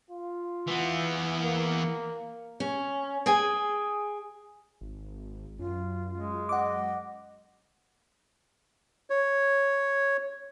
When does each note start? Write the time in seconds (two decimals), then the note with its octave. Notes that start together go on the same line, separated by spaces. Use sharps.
0.10 F4
0.67 E3 B3
1.43 A#3
2.60 C#4
3.26 G#4 G5 G#5
4.81 G#1
5.59 F#2 F4
6.13 G#3
6.49 D#5 F#5 D6
9.10 C#5